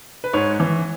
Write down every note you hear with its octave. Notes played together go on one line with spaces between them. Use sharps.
B4
G#2 C#5
E3